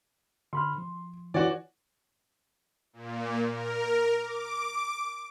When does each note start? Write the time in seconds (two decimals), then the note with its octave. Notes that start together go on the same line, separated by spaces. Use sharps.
0.53 D3 B5 C6 F6
0.78 F3
1.34 E3 F4 F#4 C#5 D5
2.93 A#2
3.49 A#4
4.21 D6